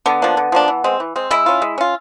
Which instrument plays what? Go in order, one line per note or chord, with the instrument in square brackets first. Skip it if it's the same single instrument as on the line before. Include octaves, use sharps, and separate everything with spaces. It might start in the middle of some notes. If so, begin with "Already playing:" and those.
[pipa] D3 [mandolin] B3
[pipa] F3 A#3 D4
D3
F3 A#3 D4
E3
G#3 C4
E3
G#3 C4
[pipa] G#3 [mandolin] E4
[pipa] C#4 F4
G#3
C#4 F4